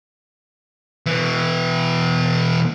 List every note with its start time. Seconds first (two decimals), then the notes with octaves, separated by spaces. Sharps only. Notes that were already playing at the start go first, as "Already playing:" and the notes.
1.06 B2 E3